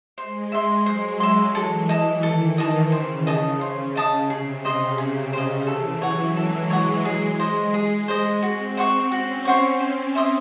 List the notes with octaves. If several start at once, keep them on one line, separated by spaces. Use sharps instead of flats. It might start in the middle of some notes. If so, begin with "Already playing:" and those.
G#3 C5
E5 C6
F#3 C5
E5 C6
E3 A4
E3 D#5 A5
D#3 A4
D#5 A5
C#3 C5
D#5 A5 D#6
C5
D#5 A5 D#6
C3 G#4
C#3 C5 D#5
C3 G#4
C#3 C5 D#5
E3 A4
F#3 C#5 F#5
G#3 A4
C#5 F#5
G#4
C5 D#5
G#4
C5 D#5
C4 F#4
C5 F#5 C#6
C#4 F#4
C5 F#5 C#6
C5
E5 C6 D#6